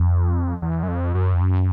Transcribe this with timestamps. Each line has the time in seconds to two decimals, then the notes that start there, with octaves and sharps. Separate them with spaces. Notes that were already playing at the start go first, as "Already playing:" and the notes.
Already playing: F2
0.62 E2
0.83 F#2
0.88 F2
1.14 F#2
1.34 F2
1.42 F#2